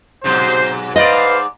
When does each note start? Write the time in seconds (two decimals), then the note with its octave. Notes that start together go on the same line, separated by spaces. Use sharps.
0.24 G#2 B2 F#3 C5
0.96 G#2 B4 C5 D5 D#5 F5